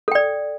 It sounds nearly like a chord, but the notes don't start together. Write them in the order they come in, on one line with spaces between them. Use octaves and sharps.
A4 G5 D5